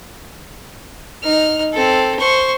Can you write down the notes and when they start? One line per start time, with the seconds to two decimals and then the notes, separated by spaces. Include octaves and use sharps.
1.23 D#4 F6
1.73 C4 A4
2.20 C5 C#6